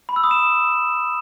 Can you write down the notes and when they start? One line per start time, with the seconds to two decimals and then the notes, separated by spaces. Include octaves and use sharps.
0.09 B5
0.16 E6
0.24 D#6
0.31 E7